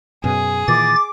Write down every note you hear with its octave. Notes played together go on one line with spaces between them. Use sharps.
F#2 B2 G#4
A#2 D#3 E3 D6 A6